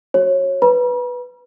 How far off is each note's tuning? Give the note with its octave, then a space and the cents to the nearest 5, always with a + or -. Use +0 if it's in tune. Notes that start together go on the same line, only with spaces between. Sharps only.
F#4 +0 C#5 -25
B4 +0 B5 -45